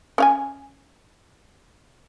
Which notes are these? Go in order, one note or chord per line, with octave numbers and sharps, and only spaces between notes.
C#4 F5 G#5